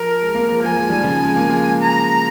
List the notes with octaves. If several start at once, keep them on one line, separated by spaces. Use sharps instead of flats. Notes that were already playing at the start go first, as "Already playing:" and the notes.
Already playing: F3 A#4
G#3
A#3
F3 G#3
F3 G#3 G#5
F3 G#3
D#3 G3
C#3 F3
G#3
A#3
F3 G#3
A#5